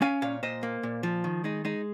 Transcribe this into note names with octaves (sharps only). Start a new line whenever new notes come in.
C#4 F5 G#5
A#2 C#5 F5
A#2 C5 D#5
A#3
A#2
F3
D#3
G#3 D#4
G#3 D#4